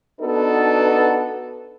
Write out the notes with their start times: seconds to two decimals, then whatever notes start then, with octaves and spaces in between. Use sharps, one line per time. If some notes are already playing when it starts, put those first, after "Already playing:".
0.20 B3 D4 D#4 F#4 A4 B4